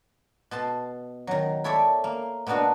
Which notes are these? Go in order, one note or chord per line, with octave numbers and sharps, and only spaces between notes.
B2 A5 C6
D#3 F#3
E4 A4 C#5 D5 E5
A#3
B2 A#3 B3 D4 F#4